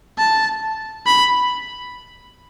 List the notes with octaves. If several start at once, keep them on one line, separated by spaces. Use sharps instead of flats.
A5
B5